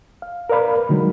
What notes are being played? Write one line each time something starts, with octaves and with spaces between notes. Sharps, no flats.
F5
A#4 B4 D5 F5 B5
D3 D#3 F#3 G#3